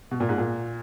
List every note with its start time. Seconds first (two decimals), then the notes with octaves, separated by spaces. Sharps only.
0.11 B2
0.20 A#2
0.29 G#2
0.38 A#2